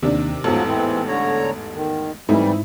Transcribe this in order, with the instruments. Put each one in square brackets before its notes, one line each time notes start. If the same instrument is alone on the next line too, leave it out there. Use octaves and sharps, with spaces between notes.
[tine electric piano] D#2 [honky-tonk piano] C3 D#3 D4
[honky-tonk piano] A1 E2 G#2 [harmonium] F3 F#3 [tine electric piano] A4
[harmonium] E3 C4
D3 C#5 A#5
D#3
[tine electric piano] G#2 E4 [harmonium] E3 G3 [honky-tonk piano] A3 C4 D#4